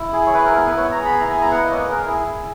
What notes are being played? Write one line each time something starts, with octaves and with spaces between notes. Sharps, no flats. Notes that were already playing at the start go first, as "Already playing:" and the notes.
Already playing: E4
G#4
C#5
E4 B4
A#4
B3 A#4
B4
B3 C#5
A#5
G#4
B5
E4 A#5
G#5
B3 A#5
F#5
A#3 D#5
C#5
B4
G#4
A#4
E4 G#4
E4